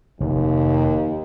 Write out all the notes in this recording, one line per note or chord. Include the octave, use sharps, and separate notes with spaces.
F1 D#2